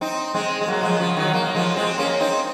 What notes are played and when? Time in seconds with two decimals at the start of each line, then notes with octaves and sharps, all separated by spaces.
0.01 C4 D#4
0.35 G#3 C4
0.61 G#3
0.68 F#3 A#3
0.83 F3 G#3
0.99 C#3 F3
1.17 D#3 F#3
1.33 F#3 A#3
1.55 F3 G#3
1.76 G#3 C4
1.98 A#3 C#4
2.20 C4 D#4